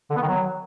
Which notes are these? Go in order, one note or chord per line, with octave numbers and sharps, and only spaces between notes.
D3
B3
D#3
F#3